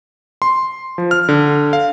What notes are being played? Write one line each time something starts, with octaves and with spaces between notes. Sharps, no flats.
C6
F3
F6
D3
F5